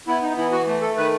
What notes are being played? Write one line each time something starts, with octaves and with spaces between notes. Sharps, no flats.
B3 E4
D#4
E3 E4
F#4
A3
A4
D#3 B4